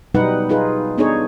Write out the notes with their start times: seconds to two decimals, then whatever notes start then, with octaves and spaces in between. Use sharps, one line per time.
0.14 B2 F#3 G3 D#4 B4 F#5
0.49 D#4 F4 G#4 B4
0.98 B3 D4 D#4 G#4 A4 C#5